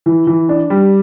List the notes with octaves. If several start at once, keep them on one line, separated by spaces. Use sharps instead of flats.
E3
E3
D4
G3